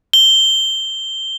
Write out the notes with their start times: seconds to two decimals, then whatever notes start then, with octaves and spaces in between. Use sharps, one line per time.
0.13 G7